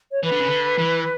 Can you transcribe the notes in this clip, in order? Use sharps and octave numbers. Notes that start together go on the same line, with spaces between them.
C#5
E3 B4
D3
C#3
D3
E3